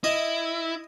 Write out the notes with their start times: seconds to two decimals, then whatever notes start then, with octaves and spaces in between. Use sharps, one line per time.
0.04 E4 D#5